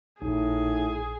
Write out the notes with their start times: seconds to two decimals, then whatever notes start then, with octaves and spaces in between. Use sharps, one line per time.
0.22 A#1 A2 D#4 G#4